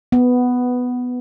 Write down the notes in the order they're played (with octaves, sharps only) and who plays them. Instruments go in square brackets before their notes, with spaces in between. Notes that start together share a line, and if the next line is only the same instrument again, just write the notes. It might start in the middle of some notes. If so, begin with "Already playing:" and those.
[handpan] B3